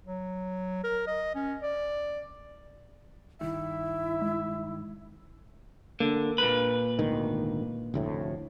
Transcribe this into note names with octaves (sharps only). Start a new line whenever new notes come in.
F#3
A#4
D#5
C#4
D5
F1 G2 D#3 E4 E5
G#3
D3 A#3
A#2 B4
G#1 D2 D#3
F1 D2 A2